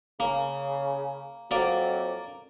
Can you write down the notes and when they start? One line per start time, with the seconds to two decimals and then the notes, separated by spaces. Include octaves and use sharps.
0.20 C#3 A#3
1.51 F2 F#3 A#3 D5